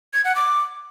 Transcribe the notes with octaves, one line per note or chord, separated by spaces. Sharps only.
G#6
F#5
D6